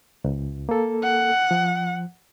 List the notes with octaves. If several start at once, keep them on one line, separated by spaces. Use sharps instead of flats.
C#2
A#3 A4
F#5
F3